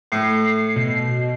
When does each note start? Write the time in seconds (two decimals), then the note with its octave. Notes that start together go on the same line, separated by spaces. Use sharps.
0.12 A2 C7
0.76 B2